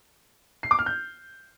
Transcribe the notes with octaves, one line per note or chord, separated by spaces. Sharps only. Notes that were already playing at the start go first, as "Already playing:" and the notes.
C7
D6
F6
G6